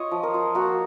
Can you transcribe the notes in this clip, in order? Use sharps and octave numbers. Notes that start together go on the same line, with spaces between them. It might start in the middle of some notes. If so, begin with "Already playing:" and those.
Already playing: F4 C#5 D#5
F3
A#4
F4
A#3 F#4